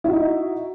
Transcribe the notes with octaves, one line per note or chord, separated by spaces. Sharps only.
D#4 E4 F#4